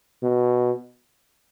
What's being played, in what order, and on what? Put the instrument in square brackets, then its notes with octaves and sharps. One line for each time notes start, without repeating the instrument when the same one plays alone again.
[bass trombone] B2